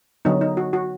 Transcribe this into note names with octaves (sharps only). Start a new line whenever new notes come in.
D3 F#3 B3 D#4
D#4
F#4
F#4